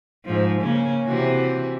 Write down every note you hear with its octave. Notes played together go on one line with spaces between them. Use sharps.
G#2 F3
C#3 A#3 C#4
C3 E3 F#4